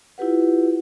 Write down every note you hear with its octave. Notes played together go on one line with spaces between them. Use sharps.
E4 F4 G4 B4 F#5